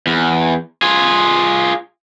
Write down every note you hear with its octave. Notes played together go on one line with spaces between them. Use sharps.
E2
F4 G#4